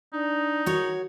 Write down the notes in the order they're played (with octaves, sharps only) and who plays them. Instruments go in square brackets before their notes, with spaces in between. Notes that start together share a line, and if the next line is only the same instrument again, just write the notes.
[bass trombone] D4 [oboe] D#4
[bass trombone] D#3 [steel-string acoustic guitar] F#4 C#5